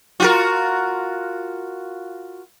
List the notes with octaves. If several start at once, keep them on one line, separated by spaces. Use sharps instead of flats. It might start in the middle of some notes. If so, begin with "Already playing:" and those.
F4 F#4 A#4